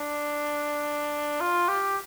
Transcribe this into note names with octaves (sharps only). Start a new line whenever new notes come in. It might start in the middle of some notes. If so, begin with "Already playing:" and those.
Already playing: D4
F4
G4